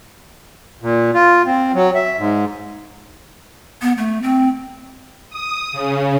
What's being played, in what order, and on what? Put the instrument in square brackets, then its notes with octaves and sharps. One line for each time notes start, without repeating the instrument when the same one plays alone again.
[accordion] A#2
F4
C4
F#3
E5
G#2
[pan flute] B3
A3
C4
[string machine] D#6
C#3